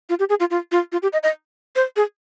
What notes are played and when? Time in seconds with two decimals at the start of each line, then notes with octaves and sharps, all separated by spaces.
0.09 F4
0.19 G4
0.29 G#4
0.40 F4
0.50 F4
0.72 F4
0.92 F4
1.02 G4
1.13 D#5
1.23 D#5
1.76 C5
1.96 G#4